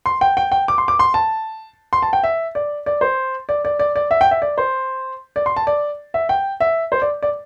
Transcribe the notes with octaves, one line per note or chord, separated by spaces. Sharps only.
C6
G5
G5
G5
D6
C6
D6
C6
A5
C6
A5
G5
E5
D5
D5
C5
D5
D5
D5
D5
E5
G5
E5
D5
C5
D5
C6
A5
D5
E5
G5
E5
C5
D5
D5